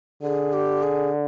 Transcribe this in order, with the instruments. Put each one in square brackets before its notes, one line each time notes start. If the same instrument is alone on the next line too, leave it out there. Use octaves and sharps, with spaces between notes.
[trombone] D3 [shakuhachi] G#4
[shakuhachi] G4
G#4